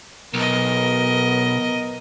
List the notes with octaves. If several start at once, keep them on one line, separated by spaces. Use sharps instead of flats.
B1 B3 A#4 D#5